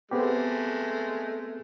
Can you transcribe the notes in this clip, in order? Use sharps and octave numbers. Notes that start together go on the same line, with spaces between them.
G#3 A3 B3 C4 G4